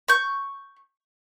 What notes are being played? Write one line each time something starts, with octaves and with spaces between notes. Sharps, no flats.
C#6 G6